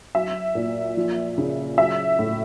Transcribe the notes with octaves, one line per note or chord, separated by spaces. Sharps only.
F#3 E5
A#2
F3
C#3
F#3 E5
A2